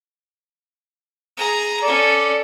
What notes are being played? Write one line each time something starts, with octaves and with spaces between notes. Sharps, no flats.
G#4 A#5
C#4 A4 D5